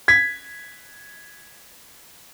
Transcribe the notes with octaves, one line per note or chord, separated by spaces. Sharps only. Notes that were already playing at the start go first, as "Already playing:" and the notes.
G#6 B6